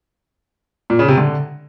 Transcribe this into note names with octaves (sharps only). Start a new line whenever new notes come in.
A#2
C#3
C3
D3